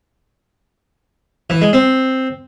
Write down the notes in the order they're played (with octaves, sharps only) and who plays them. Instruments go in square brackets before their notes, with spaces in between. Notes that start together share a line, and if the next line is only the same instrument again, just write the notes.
[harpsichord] E3
G#3
C4